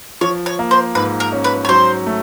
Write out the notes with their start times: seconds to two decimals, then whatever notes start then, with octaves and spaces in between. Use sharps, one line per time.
0.21 F3 C#5
0.46 C#5
0.59 A#3
0.71 C5
0.95 G#2 B4
1.20 A#4
1.32 C#4
1.44 B4
1.65 C#5
1.69 F#3 C5
2.06 A3